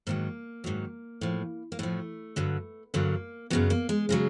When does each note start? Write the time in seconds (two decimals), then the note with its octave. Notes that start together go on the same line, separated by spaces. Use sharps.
0.07 G#2 D#3 F#3 A#3
0.64 G#2 D#3 F#3
1.21 A2 F3
1.72 A#3
1.79 A2 F3 A3
2.36 G2 D3 F#3
2.94 G2 D3 F#3 A#3
3.50 F#2 C#3 F#3 B3
3.70 A#3
3.89 G#3
4.09 C#3 F#3 G#3